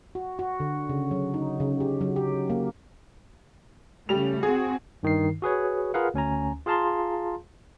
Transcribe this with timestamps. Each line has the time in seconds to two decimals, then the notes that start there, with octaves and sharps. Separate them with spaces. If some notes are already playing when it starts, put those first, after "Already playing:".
0.15 F#4
0.39 F#4
0.60 D3
0.89 C#3
1.11 F#3
1.34 D#4
1.60 C#3
1.80 G4
2.01 F#3
2.16 G4
2.50 A#3
4.09 C#3 G3 A3 F7
4.43 C4 F#4 G#4
5.03 G2 D#3 D#4 C7
5.42 F#4 G#4 B4 C#5
5.94 F4 G#4 A#4 B4 F5 F#5
6.14 D2 C#4 G#5 A#5
6.66 F4 G#4 F5 A5 A#5 C6